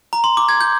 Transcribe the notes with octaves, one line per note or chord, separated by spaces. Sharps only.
A#5
C6
D6
G#6
G6